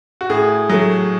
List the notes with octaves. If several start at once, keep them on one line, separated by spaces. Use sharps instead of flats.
F#4
A2 G#4
F#3 A3